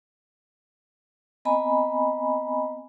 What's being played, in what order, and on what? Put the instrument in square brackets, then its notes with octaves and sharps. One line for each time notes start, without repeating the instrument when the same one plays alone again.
[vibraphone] B3 C4 D#5 G#5 A#5 B5